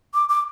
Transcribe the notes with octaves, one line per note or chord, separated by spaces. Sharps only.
D6
D6